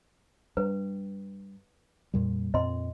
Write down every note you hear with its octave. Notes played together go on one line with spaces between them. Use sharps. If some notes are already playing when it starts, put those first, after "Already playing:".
G2 B4
F2 A#2 G3
F2 A#2 C4 D#5 C6